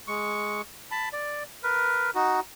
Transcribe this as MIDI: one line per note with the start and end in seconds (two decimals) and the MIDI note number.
0.08 0.61 56
0.08 0.61 85
0.91 1.09 81
0.91 1.09 83
1.13 1.43 74
1.63 2.11 70
1.63 2.11 71
2.15 2.40 63
2.15 2.40 66